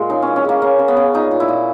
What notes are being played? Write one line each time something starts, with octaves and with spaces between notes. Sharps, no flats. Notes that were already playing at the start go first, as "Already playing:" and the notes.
Already playing: A#2 G#3 F#4
C#3 D#4
E3 C#4
C#4
C#3 A#3
C#3 A#3
C#3
B3
C#3
A#2 D#4
A#2
E4
A#2